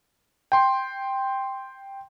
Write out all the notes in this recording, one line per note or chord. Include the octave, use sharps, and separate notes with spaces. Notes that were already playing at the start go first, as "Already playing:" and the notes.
G5 C6